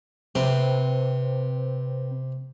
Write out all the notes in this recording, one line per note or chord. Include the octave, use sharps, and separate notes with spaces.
C3 C4 B4